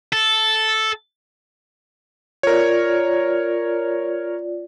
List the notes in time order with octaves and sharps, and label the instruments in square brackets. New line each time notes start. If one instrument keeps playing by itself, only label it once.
[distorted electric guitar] A4
[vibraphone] F4 D5 [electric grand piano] A#4 C#5